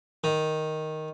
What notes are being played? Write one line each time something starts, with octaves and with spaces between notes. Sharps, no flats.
D#3